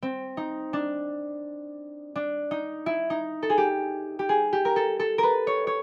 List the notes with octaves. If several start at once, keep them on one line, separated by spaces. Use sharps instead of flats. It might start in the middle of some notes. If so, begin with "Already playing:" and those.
C4
D#4
D4
D4
D#4
E4
D#4
A4
G#4
G4
G4
G#4
G4
A#4
A4
A4
A#4 B4
C#5
C#5